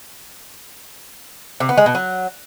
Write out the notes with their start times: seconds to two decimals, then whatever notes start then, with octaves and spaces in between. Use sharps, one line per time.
1.60 C3
1.69 B3
1.78 G#3
1.86 B2
1.95 F#3